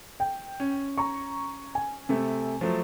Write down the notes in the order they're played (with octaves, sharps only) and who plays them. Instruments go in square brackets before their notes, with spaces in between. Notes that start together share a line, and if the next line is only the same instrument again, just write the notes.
[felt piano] G5
[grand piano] C#4
[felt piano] A#5 C#6
G#5
[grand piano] C3 A3
F3 F#3 A3